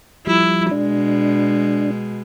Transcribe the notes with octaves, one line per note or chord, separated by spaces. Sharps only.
F3 G3 E4
B2 G#3 D4